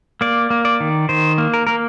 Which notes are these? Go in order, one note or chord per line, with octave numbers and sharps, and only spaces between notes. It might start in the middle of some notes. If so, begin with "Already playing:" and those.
A#3 D5
A#3
D5
D#3
D#3 C5
A#3
A#4
A#3 A#4